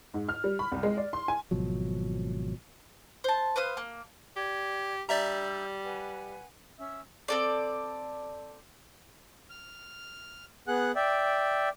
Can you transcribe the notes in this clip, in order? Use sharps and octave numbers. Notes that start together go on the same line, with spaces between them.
G#2
F6
G3
B5
C2
G#3
D5
C6
G#5
G#1 B2 F3 F#3
C5 A5
B4 C5 F5 D#6
A#3
G4 D5 G#6
G3 D4 D5 E5 A#5 E6 G6
B4 F#5 G#5
C#4 E5 E6
C4 A4 D5
F6
B3 G#4 F#5 F#6
D5 E5 G5